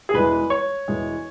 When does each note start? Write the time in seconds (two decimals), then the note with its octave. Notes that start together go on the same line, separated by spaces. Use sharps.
0.09 G#4
0.14 E1 E2 E3 G#3 B4
0.50 C#5
0.88 E1 E2 E3 G#3